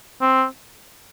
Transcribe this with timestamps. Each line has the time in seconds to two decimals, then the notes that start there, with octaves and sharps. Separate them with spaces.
0.21 C4